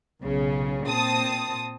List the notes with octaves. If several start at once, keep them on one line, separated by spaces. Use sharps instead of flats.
B1 C#3
A#2 C4 A5 D#6